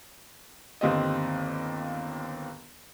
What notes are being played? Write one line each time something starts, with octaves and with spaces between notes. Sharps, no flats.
G1 D#2 C4 G4 D#5